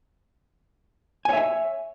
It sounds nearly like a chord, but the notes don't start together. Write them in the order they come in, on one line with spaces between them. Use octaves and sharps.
G#5 C#5 E5